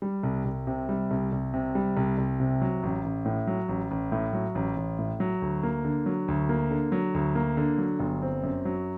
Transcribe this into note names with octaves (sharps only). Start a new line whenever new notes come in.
G3
C2
C2
C3
G3
C2
C2
C3
G3
C2
C2
C3
F#3
A1
A1
A2
F#3
A1
A1
A2
F#3
A1
A1
A2
F#3
D2
A#3
D3
F#3
D2
A#3
D3
F#3
D2
A#3
D3
F#3
G1
C4
F#2
F#3